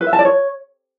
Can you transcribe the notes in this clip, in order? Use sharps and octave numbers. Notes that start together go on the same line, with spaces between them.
B4
E5
A5
D5
C#5